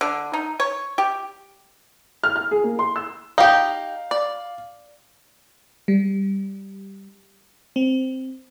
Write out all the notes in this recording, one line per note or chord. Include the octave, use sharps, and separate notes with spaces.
D3
D#4
C#5
G4
F6
F6
G#4
A#3
C6
E6
D#4 G4 F5
D5
G3
C4